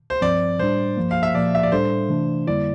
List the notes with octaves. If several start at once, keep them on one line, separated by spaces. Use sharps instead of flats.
C5
G2 F3 C4 D5
A2 G3 D4 C5
G2 F3 A#3
F5
E5
A#2 F3 A#3 D5
E5
D5
A2 G3 D4 A4 C5
C3 E3 A3 D4
F2 D3 G3 A#3 E4 D5